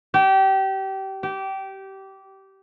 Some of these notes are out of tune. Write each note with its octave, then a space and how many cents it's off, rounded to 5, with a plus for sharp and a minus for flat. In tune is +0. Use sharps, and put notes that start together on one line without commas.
G4 -25
G4 -20